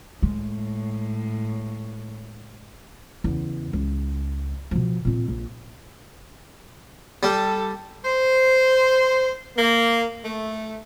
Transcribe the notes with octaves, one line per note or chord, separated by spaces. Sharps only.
A2 G#3
E2 C#3
C#2
B2 F3
A#2 C4
A#1
G3 A4
C5
A#3
A3